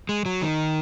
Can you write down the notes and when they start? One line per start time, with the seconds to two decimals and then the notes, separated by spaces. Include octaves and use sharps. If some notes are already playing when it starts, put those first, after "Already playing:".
0.09 G#3
0.26 F#3
0.42 D#3